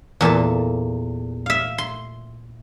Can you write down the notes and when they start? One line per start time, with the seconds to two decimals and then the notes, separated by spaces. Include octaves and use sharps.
0.21 E2 A#2 A4 A5
1.46 E5 F5
1.78 C6